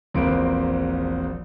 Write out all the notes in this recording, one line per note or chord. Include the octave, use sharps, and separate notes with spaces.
E1 A#1 A#3 C4 B4 D7